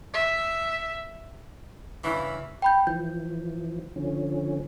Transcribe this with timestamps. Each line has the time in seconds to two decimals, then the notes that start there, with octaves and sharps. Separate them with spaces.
0.14 E5
2.04 G2 C#3 E3 E4
2.62 G5 B5 G6
2.87 E3 F3 G6
3.96 D3 F3 C#4